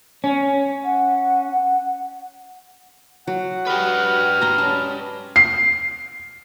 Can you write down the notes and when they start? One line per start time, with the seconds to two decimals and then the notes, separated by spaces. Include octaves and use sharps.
0.24 C#4 C#5
0.85 F#5
3.27 F#3 F#5
3.67 F#4 G4 B4 D#6 F6
4.42 A#5 C6
4.58 C#4 A5
5.36 C7